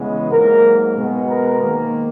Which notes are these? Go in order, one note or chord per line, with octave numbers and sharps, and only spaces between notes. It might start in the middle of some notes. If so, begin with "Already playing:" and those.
Already playing: C#3 E3 G#3 B3
G#2 F#3 A#3 A#4
B2 G#3 B3
A#4
G#2 D#3 A#3